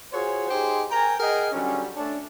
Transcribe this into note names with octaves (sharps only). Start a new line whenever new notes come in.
F4 F#4 G#4 C5 C#5
D#4 G4 G#4 C5
A#4 G5 G#5 A#5
G#4 A#4 D#5 F#5 G5
D3 F#3 G3 C#4
A3 C#4 D4